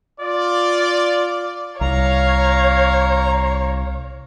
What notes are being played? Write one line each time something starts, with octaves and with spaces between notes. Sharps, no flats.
F4 D5
C2 C#5 F5 A#5